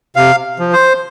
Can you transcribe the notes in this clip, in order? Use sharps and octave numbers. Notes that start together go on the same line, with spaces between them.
C3 F5
F3
C5